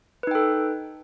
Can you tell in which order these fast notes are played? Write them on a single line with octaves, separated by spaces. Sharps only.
B4 D#4 G5 A4